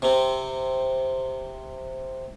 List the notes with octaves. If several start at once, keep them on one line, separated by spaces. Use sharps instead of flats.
C3 C4